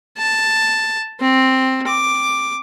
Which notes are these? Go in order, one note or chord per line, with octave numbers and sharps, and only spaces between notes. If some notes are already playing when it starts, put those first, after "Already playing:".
A5
C4
D6